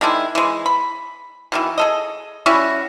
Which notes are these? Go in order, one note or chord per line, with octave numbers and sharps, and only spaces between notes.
D#3 G#3 D4 E4
E3 G#3
B5
B2 D#3 E3
G#4 A4 D#5
G3 C#4 E4 F#4